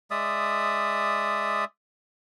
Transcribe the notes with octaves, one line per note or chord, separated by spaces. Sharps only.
G#3 D5 E5 D#6